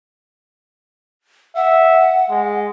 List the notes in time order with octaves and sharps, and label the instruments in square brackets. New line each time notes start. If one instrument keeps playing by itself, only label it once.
[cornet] E5 [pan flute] F#5
[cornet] G#3